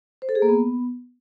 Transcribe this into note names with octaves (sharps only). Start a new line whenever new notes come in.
C5
A4
G#4
A#3
B3